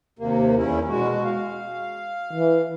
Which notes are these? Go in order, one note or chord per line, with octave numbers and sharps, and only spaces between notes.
D#2 C3 A#3
E2 C#4 E4
B2 G#3 F#4
F5
E3